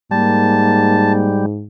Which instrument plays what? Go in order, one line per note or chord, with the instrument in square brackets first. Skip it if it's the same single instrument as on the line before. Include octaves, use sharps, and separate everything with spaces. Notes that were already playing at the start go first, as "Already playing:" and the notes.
[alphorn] G#2 [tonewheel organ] G3 [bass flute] A#3 [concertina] A5